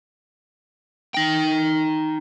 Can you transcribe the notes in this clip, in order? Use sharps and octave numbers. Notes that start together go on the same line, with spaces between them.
D#4 G5